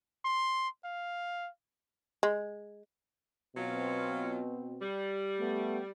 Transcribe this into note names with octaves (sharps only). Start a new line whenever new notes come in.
C6
F5
G#3
B2 F#3 C4 C#4 F4
G3
A3 B3